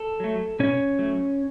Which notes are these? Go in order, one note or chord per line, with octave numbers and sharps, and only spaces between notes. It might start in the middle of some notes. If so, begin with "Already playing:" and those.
Already playing: A4
F#3 A3
B2 C#4 C#5
F#3 A3